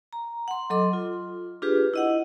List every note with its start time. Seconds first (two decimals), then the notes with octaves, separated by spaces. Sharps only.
0.13 A#5
0.48 F#5 C6
0.70 F#3 A4 D#5 C6 D6
0.93 F4
1.62 D4 F4 G4 G#4 B4
1.94 E4 D#5 F#5